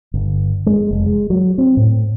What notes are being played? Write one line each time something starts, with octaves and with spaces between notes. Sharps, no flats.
G1
G#3
F1
G#3
F#3
C4
A2